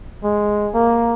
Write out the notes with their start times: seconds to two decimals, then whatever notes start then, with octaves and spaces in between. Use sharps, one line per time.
0.23 G#3
0.74 A#3